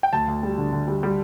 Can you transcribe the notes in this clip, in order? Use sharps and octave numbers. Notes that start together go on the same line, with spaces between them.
G5
D2 A5
D2
G3
D3
D3
G3
G3